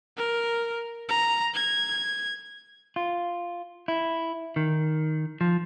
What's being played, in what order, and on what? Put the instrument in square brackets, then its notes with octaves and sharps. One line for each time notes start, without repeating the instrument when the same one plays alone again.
[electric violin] A#4
A#5
G#6
[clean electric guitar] F4
E4
D#3
F3